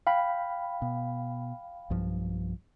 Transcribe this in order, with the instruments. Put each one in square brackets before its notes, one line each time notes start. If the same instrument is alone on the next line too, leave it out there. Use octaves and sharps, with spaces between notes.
[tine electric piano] F5 G5 B5
[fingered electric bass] B2
B1 G2 F3